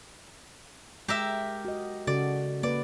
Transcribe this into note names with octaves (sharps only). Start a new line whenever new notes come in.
G#3 G4 A#4 E5
F#4 D#5
C#3 F#4 A4 D5
A#3 B4 D5